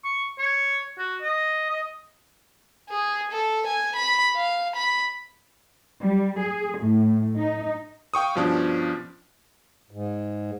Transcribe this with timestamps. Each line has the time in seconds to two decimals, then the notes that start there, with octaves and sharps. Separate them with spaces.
0.04 C#6
0.38 C#5
0.98 F#4
1.21 D#5
1.70 D#5
2.89 G#4
3.31 A4
3.67 G#5
3.96 B5
4.36 F5
4.75 B5
6.00 G3
6.39 G#4
6.79 A2
7.38 D#4
8.14 F5 G5 C#6 D#6
8.35 G2 B2 F3 C#4 D4
9.91 G#2